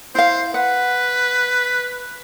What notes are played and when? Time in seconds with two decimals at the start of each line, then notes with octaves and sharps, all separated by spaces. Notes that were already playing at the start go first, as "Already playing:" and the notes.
0.15 E4 C5 F5
0.54 B4 F#5